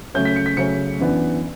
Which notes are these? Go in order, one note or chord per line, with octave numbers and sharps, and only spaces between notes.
C#3 F#3 A3 C#4 G6
B6
C#7
B6
C#3 F#3 A3 C#4 C#7
F#2 E3 B3 D4